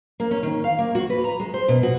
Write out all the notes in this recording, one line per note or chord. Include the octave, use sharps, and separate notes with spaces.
A#3
C#4
D#3
F5
A#3
F#4
B4
A#5
G#3
C5
B2
F#4